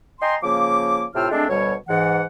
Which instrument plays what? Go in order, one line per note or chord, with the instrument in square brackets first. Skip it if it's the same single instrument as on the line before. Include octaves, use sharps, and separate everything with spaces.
[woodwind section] D#5 G5 G#5 A#5 C6
C#3 F3 A#3 D6
A2 C3 F4 G5 E6 F6
G#3 A3 C4 D4
D2 B2 G3 C#5
G#2 E3 F#5